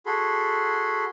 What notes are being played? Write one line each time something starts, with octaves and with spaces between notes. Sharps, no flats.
F#4 G#4 A4 B5 C6